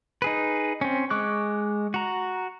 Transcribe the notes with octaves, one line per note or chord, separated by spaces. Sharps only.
D#4 G#4 B4
C4 C#4
G#3 C#6 D6 F#6
F#4 A#5